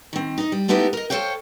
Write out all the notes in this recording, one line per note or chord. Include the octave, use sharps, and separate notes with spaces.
D#3 C4
D#4 D#5
G3
G#3 A3 B3 D#4 E4 G4
A#4 D#5
A4 A#4 C5 C#5 F5 G5